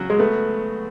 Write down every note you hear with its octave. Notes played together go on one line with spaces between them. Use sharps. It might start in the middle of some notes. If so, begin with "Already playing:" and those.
Already playing: C#3 F#3 F#4
G#3
A3 B3